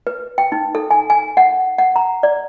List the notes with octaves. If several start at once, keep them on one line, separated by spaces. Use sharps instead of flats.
B4
G5
D#4
A4
G#5
G#5
F#5
F#5
A#5
D5